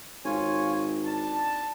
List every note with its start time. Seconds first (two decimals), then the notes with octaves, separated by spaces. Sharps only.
0.25 G#1 F4 C#5 G#5
1.04 D4 A5